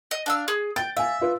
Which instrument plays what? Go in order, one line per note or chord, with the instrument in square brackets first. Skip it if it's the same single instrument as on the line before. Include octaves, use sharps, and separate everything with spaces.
[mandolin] D#5
D4 F5 E6
G#4
[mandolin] G5 [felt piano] A6
[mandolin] E5 [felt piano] F5 G#5
[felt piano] F4 B4